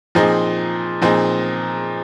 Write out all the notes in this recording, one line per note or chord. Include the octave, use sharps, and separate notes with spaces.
A#2 F3 C4 D#4 G#4
A#2 F3 C4 D#4 G#4